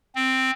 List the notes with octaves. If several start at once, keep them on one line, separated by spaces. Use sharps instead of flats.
C4